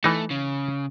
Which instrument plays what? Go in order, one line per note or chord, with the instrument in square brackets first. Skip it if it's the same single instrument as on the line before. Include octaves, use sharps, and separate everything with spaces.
[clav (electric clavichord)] E3 D#4 [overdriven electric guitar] A3
[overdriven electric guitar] C#3